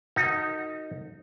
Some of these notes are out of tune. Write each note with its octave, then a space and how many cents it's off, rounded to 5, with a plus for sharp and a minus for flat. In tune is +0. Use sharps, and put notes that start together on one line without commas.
D#4 +0 F#4 +0 A#4 -45